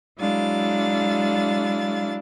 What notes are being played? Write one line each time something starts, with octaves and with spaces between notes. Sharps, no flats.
F#3 G#3 D4 E4 F5 A6